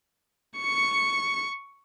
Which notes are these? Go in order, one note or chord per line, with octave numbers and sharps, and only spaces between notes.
C#6 C#7